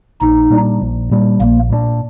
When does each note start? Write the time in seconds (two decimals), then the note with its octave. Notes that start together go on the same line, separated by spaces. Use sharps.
0.21 A#1 D#4
0.50 A#2 G3 D4
0.81 A#1
1.11 A#2 G3 D4
1.40 A#1 A#3
1.70 A#2 G3 D4